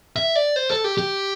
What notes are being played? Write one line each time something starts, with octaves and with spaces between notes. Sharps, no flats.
E5
D5
C5
A4
G4
G4